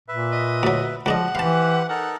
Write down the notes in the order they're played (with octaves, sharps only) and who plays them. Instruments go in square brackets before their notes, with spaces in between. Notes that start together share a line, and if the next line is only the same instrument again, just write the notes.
[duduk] A#2 [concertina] B4 E5
[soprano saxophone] D#5
[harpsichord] D2 F#3
[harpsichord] C#2 D4 D#5 [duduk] F3 [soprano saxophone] F#5
[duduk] E3 [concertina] G4 B4 C5 [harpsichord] F5 A5
[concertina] D#4 A4 A#4 [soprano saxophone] F#5